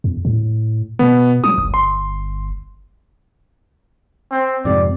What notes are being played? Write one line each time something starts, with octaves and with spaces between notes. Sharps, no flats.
E2
A2
B2 B3
F#3 D#6
G1
C6
C4
F2 G#2 C3 D5